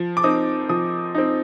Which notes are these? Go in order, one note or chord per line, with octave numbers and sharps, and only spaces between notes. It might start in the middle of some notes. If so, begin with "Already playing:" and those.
Already playing: F3
D6
C4 D#4 D#6
F3 D#6
C4 D#4